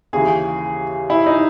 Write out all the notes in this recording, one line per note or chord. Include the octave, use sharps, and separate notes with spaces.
D#2 C#3 E3 G#4
E4
D#4